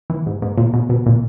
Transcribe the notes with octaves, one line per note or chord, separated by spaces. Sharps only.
E3
G#2
G#2
A#2
B2
B2
A#2